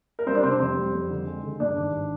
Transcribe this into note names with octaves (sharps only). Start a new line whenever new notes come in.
A#4
G3 C4 C5
D4 D5
C3 C4 C5
F2 C4 C5
G3
F2
D3
G#3
D3
G2 D4 D5
G#1